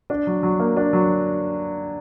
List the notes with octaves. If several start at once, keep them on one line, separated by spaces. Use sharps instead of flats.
D4
F#3
F#3
A#3
D4
F#3